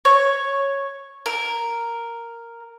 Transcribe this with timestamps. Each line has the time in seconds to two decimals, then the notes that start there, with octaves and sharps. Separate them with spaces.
0.05 C#5
1.26 A#4